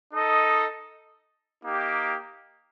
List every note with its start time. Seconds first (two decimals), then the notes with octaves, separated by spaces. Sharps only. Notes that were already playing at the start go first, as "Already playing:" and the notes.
0.14 D#4 A4 D#5
1.64 A#3 D#4 G4